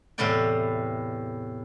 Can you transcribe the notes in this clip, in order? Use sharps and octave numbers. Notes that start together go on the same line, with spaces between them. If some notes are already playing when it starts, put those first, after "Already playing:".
E2 A2 C3 B4 D5 G5